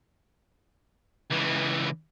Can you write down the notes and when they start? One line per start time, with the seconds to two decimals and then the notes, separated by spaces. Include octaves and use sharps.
1.30 C#2 E3